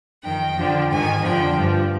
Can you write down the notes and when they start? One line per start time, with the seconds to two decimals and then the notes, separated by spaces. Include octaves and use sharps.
0.23 F2 D#3 G5
0.56 F2 D3 F3
0.89 G#2 D#3 G#5
1.22 F2 D3 F3 G5
1.55 G2 F3